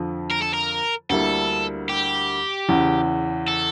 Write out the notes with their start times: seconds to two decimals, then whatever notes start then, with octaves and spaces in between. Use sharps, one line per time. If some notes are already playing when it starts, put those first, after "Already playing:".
Already playing: F2 D3 F3
0.31 A#4
0.42 A4
0.53 A#4
1.10 D2 D3 G3 A#3 E4 A4
1.89 G4
2.68 E2 C#3 E3
3.48 A4